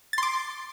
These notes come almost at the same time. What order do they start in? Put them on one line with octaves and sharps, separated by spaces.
A6 C6 D6